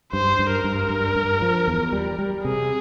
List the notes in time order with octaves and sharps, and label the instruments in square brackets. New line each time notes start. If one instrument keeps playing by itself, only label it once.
[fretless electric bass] G2 [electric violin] C5
[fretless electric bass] G2
[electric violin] A#4
[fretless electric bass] G2
G2
G2
F3
E2
G3
G3
[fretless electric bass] C3 [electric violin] G#4